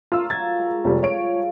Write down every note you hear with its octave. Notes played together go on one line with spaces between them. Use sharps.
A3 F4 A#4 C#5 E6
F#3 F4 G#6 A6
G#3 A#5 B5
F1 F3 G3 C#5
F3 G3 C#5 D7
F3 G#3 G4